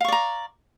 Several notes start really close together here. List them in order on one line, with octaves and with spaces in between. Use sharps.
F5 C#6 D5 A#5